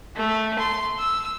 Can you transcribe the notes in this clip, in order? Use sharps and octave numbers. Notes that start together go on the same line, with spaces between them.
A3
C6
E6